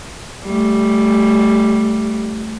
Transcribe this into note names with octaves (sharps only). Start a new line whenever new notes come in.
G3 A3